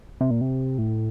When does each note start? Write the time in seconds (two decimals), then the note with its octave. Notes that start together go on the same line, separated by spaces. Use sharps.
0.21 C3
0.31 A#2
0.41 C3
0.78 A2